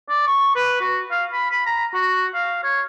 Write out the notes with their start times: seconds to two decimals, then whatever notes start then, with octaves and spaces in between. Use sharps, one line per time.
0.09 D5
0.27 C#6
0.56 B4
0.81 F#4
1.11 F5
1.33 B5
1.51 B5
1.66 A#5
1.94 F#4
2.34 F5
2.64 C#5